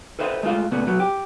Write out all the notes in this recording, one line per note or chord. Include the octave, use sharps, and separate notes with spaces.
A4 B4 C5 D#5 E5
G#3 A3 F4 F5
A#2 C#3 A3 B3
B2 F#3 B3
G4